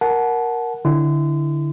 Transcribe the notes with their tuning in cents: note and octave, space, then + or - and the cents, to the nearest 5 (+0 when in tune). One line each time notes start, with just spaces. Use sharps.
A#4 +10 F#5 +0 A5 -30
D3 +0 E4 +0 C6 -35